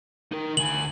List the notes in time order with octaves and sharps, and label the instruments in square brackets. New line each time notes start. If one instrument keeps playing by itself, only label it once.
[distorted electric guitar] D#4 A#4
[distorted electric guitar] D2 G#5 [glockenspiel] F#7